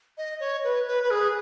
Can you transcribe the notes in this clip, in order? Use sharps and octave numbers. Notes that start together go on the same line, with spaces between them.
D#5
C#5
B4
B4
B4
G#4